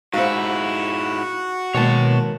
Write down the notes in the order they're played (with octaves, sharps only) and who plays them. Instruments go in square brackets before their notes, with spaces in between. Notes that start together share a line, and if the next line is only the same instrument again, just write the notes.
[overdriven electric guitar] G#2 E4 [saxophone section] F#4 [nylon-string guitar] C5 F5
[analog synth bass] B2 [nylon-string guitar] D#3 G#3 A#3 [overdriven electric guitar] C#5 A5